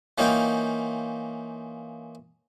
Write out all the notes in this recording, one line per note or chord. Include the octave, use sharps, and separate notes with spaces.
E3 A#3 C#4 D#4 F4 G5